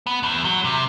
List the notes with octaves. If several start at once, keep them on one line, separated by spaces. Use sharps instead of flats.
B3
E2
F#3
C3